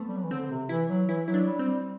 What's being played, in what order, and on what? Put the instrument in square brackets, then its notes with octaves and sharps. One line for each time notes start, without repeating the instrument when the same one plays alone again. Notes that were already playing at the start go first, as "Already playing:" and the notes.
Already playing: [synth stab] A3 B3 C4
[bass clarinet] G3
F#3
E3
[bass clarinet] D3 [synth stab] C4
[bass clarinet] D3
C3
[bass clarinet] E3 [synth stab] E4
[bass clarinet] F#3
[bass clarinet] E3 [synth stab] E4
[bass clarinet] F#3 [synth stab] E4
[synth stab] D4
[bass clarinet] G3
[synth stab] C4
[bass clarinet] G3